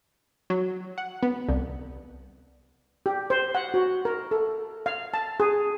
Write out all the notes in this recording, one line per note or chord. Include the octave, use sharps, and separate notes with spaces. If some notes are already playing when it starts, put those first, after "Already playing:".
F#3
F#5
B3
C2
G4
C5
F#5
F#4
A#4
A4
F5
A5
G#4